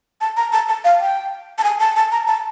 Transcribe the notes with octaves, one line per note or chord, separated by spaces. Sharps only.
A5
A#5
A5
A5
F5
G5
A5
G#5
A5
A5
A#5
A5